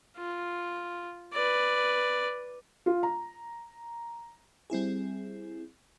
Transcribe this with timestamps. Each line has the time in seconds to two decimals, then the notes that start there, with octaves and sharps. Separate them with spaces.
0.17 F4
1.33 B4 D5
2.86 F4
3.03 A#5
4.70 G3 C4 E4 G#4